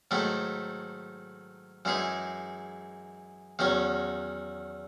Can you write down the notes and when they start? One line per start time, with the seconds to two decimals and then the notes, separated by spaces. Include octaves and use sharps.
0.11 G#2 D#3 F#3 A3 E4
1.85 F#2 E3 G#3 D#4 G#4
3.59 E2 D#3 F#3 C#4 F#4